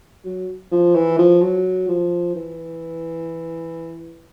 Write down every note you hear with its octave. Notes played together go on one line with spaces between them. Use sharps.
F#3
F3
E3
F3
F#3
F3
E3